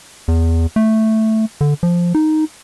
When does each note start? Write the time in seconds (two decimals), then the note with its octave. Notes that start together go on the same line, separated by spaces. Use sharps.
0.28 E2
0.76 A3
1.61 D3
1.83 F3
2.15 D#4